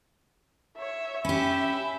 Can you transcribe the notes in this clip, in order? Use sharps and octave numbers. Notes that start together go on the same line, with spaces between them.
C#5 E5
C#4 G4 E5 B5